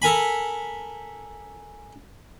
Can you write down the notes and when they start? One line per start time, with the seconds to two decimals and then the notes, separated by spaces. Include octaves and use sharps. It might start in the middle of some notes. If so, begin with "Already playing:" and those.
0.02 A4 A#4 G#5 B5